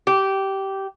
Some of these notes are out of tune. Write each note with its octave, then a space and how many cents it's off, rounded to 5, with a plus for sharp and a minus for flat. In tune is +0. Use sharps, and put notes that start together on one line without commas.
G4 -15